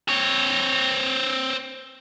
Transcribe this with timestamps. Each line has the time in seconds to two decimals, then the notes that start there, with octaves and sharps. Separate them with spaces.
0.09 C4 C#5